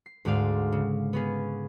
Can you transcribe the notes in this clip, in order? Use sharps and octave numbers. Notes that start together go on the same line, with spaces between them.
C7
D2 G#2 G#3 D5 F5
C#3
B3 C#4 G#4